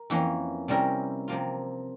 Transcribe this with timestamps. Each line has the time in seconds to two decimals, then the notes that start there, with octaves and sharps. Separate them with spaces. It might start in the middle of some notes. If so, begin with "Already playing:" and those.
Already playing: A#4
0.10 F2 E3 A#3 C#4
0.68 C3 G3 C#4 E4 A#4
1.28 C3 F3 A#3 F4